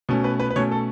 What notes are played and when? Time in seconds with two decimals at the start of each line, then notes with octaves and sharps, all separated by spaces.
0.09 B2 A3 C#4
0.24 B4
0.40 B4
0.51 B4
0.56 B2 A3 C#4 C#5
0.71 A4